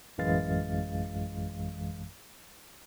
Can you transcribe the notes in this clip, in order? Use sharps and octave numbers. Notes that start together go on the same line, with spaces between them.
A1 F#2 E3 G#3 F5 A6